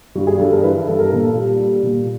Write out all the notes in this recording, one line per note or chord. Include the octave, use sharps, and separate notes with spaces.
G2 F#4
G#4
G2 A4
A#4
E3 B4
G2 A4
A#4
A#2 A4
G3
G3
A#2